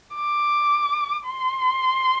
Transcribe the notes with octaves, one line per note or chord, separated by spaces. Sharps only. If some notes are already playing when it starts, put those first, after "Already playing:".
D6
C6